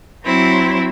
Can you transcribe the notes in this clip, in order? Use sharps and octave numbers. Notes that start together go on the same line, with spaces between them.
F#3 C4 E4